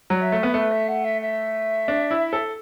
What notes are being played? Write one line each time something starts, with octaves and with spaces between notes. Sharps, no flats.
F#3 D5
E5
A3
B3
A3 B4
E5
F#5
E5
E5
D4
E4
A4